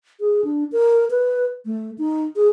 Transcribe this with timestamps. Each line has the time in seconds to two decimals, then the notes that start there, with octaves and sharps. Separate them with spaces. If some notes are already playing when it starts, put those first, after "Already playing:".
0.20 G#4
0.44 D4
0.72 A#4
1.10 B4
1.66 A3
1.98 D#4
2.36 G#4